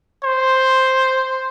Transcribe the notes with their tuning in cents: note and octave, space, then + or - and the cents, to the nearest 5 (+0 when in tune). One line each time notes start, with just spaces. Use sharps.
C5 +5